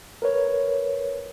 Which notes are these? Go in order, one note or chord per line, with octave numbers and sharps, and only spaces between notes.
A#4 B4 C#5